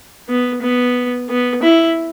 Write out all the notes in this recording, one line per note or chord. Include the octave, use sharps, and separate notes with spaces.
B3
B3
B3
E4